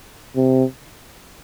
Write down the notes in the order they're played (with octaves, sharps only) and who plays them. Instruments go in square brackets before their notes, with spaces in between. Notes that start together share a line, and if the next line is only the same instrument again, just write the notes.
[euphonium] C3